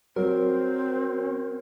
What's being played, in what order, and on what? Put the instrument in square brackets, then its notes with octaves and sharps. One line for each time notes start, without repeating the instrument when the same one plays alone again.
[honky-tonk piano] F#3 [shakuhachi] C4 [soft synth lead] A#4